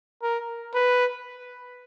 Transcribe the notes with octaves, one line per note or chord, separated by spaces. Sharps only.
A#4
B4